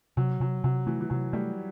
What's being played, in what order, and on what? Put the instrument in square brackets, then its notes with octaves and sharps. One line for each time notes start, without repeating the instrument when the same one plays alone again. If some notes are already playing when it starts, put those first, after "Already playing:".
[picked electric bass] C3 [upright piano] F#3
[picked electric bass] C3 [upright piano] F#3
[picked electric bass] C3 [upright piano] F#3
[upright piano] E3 [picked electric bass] A3
[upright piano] E3
[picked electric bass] C3 [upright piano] F#3
[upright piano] G3 [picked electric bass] A3